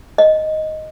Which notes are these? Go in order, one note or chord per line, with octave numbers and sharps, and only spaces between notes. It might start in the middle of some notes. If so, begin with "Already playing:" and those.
D#5